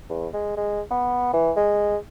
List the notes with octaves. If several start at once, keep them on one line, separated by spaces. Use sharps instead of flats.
E2
G#3
G#3
B3
E3
G#3